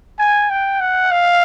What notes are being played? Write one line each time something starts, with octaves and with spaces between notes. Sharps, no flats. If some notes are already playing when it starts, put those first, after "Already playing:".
G#5
G5
F#5
F5